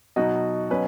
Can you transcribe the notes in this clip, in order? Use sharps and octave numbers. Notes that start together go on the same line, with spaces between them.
B2 F#3 D#4 F#4 D#5
B2 F#3 C#4 B4